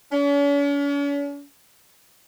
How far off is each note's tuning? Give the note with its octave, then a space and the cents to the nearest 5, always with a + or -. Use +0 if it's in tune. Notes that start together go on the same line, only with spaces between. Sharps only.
C#4 +45